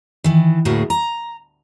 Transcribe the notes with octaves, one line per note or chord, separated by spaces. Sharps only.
D#3 E3
D2 A2 A#3 F#4 G#4
A#5